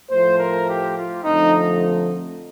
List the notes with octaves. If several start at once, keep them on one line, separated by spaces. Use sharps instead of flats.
A2 F3 A3 C5
A#4
G4
F4
F2 D3 F3 A3 D#4